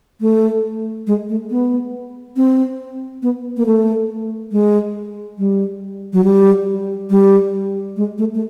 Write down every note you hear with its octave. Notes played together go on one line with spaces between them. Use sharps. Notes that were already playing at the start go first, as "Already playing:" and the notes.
A3
G#3
A3
B3
C4
B3
A#3
A3
G#3
G3
F#3
G3
G3
G#3
A3
A3